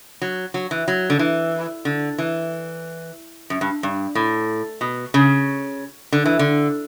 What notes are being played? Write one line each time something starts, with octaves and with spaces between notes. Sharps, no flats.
F#3
F#3
E3
F#3
D3
E3
D3
E3
F#2
G2
G2
A2
B2
C#3
D3
E3
D3